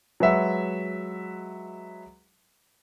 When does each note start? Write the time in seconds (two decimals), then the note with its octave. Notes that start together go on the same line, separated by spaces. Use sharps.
0.20 F#3 G#3 B4 E5 F#5